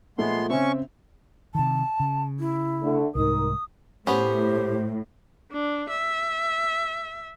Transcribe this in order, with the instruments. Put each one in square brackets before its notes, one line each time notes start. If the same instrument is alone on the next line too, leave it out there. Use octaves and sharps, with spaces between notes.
[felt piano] A#2 F3 A3 [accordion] G#3 B3 C6
[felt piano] C#3 C4 E5 [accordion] C#4 C#6
[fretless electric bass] C3 D#3 [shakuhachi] A5
[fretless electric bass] C#3
[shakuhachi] E4
[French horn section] D3 A3
[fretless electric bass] C2 G#2 [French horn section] D#4 A#4 [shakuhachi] D#6
[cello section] A2 [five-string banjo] B3 C#4 [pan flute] G4 [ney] C5
[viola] D4
E5